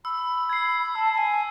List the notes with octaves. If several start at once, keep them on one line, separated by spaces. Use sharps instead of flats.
B5 E6
G#6 C7
A5 E6
A5
G#5